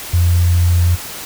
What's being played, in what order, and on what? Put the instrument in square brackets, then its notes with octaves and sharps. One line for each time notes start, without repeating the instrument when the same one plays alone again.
[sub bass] F2